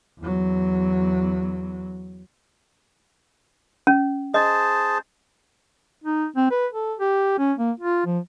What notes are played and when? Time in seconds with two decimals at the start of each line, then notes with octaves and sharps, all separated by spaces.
0.20 E2 F#3
3.87 C#4
4.34 G#4 C5 D#5 A5
6.04 D#4
6.36 C4
6.51 B4
6.73 A4
6.99 G4
7.38 C#4
7.58 A#3
7.80 F4
8.06 F3